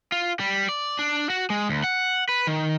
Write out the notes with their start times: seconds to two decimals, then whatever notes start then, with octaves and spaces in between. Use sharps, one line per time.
0.12 F4
0.39 G3
0.69 D5
0.99 D4
1.30 F#4
1.50 G#3
1.69 D2
1.84 F#5
2.29 B4
2.47 D#3